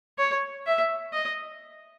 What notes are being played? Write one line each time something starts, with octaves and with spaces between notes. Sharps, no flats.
C#5
E5
D#5